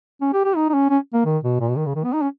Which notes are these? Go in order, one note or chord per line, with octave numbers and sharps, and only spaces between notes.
C#4
G4
G4
D#4
D#4
C#4
C#4
A#3
D#3
B2
A#2
B2
D#3
C#3
D#3
B3
D#4
C#4